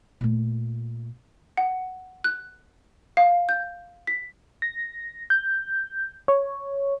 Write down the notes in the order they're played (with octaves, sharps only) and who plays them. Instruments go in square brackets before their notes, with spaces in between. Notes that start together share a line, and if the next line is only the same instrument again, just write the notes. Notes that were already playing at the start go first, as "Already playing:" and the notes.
[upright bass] A#2 A3
[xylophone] F#5
F#6
F5
G6
B6
[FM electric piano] A#6
G6
C#5